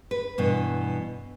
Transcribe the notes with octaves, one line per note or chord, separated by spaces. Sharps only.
B4
G2 B2 E3